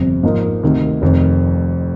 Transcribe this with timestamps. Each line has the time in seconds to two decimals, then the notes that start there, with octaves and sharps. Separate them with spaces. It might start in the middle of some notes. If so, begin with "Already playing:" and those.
Already playing: G1 F2 C3
0.23 G#2 F3 A#3 D#4
0.63 D2 C3 D#3
1.02 F1 F2 D#3